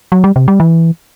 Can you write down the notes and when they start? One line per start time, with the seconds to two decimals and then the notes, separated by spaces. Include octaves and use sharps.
0.12 F#3
0.24 G3
0.36 C3
0.48 G3
0.60 E3